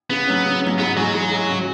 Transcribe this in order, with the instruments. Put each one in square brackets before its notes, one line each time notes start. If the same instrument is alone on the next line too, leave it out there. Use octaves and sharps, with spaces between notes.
[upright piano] C#3 [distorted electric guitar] B3
[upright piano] F#3 C#4
C#3
F#3 C#4
[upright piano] G#2 [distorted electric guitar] B3
[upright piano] E3 G#3 [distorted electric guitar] F#3
[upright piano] G#2
E3 G#3
C#3